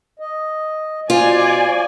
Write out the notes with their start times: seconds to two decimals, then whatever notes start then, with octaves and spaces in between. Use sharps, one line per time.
0.19 D#5
1.10 B2 F4 C5 D5 G#5